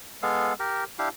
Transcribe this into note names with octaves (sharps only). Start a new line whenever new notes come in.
G#3 B3 A4 F5
G4 A#4
D4 E4 G4 F5